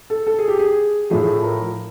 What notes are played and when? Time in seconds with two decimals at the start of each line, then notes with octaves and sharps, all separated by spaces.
0.10 A4
0.27 A4
0.39 G#4
0.48 G4
0.59 G#4
1.10 A2 F3 A3 G#4
1.43 A#4